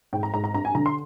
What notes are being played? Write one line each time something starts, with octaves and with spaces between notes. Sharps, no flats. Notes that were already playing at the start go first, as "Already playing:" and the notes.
G#2 G5
A#5
G#2 A#5
A#5
G2 A#5
G#5
D3 A#5
C6